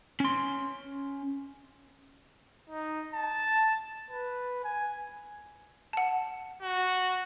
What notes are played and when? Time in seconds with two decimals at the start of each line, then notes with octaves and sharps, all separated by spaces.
0.20 C#4 C6
2.70 D#4
3.14 A5
4.11 B4
4.64 G#5
5.93 F#5 A5
6.62 F#4